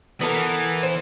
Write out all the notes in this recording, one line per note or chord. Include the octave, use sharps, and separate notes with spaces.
E3 B3 A4 A#4
C5